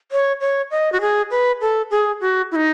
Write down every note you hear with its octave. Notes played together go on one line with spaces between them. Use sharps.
C#5
C#5
D#5
F#4
G#4
B4
A4
G#4
F#4
E4
D#4